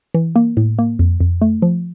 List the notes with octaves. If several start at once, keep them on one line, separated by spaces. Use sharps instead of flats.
E3
A#3
A2
A#3
F2
F2
A3
F3